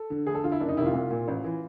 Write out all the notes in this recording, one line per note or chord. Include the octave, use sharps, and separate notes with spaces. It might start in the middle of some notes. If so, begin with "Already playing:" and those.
Already playing: A4
D3
D2 G#4
A4
D3 F4
E4
F#1 D4
D#4
F2 C3 D#3 E4
F4
C2
A#2
A1
E3